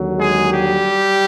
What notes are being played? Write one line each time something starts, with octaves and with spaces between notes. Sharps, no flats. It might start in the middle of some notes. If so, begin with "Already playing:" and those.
Already playing: D#2 D3 F#3
G#3 G#4
G3 G4